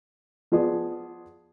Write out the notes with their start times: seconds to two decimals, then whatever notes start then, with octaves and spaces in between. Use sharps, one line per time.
0.52 F3 B3 F4 G#4 D5